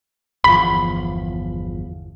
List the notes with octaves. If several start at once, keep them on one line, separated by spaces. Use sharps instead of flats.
G1 E2 F3 B5